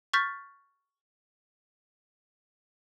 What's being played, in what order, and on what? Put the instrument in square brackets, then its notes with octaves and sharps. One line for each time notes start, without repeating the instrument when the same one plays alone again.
[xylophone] C#6 F6 G6 A6 B6